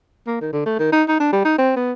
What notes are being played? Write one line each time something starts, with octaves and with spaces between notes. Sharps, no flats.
A#3
D#3
D3
A3
D#3
D#4
D#4
D4
G3
D#4
C4
B3